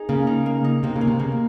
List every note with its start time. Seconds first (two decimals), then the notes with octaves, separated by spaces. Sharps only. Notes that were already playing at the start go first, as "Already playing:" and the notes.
Already playing: D#4 G#4
0.09 C#3 A#3
0.27 D#4
0.46 A#3
0.64 D#4
0.83 C3 A#3
0.96 C#3
1.01 A#3
1.08 C3
1.19 C#3 A#3
1.32 C3